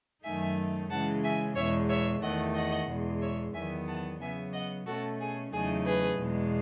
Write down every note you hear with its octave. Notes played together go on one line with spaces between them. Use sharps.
F#2 D#3 F#3 A3 D#4 E5 G#5
C#3 E3 G#3 C#4 F#5 A5
E5 G#5
E2 B2 G#3 C#5 E5
C#5 E5
E2 D#3 A3 D#5 F#5
D#5 F#5
E2 B2 G#3
C#5 E5
E2 D#3 F#3 B3 E5 G#5
F#5 A5
C#3 F#3 B3 E5 G#5
D#5 F#5
B2 A3 C#4 F#4 A4
G#4
E2 C#3 F#3 A3 D#4 G#4
G#4 B4
E2 B2 G#3